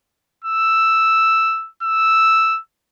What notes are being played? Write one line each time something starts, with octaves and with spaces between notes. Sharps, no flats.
E6
E6